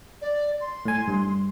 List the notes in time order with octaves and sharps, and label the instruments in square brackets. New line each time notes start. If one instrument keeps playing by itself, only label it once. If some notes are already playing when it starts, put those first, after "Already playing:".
[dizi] D5
C6
[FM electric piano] A2 G#5
G2